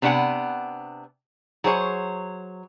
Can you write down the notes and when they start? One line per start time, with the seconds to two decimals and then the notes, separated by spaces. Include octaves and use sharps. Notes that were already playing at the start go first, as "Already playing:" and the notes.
0.02 C3 B3 D4 F#4 F#5 G#5
1.64 F#3 G#4 C5 C#5